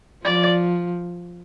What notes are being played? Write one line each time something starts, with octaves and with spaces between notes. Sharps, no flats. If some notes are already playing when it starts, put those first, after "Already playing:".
F3 D5